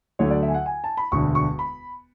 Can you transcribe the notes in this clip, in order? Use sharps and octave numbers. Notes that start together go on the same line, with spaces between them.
D2 D3 F#3 A3 C#5
D5
E5
G#5
F#5
G#5
A5
B5
E1 D2 D3 C#6
C#6
B5